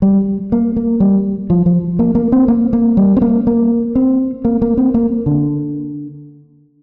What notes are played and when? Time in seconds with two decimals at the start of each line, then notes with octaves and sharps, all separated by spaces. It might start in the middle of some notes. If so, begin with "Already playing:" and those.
0.02 G3
0.52 A#3
0.76 A#3
1.00 G3
1.50 F3
1.66 F3
1.99 A#3
2.15 A#3
2.32 C4
2.48 A#3
2.73 A#3
2.97 G3
3.17 C4
3.22 A#3
3.47 A#3
3.95 C4
4.45 A#3
4.62 A#3
4.77 C4
4.94 A#3
5.26 D3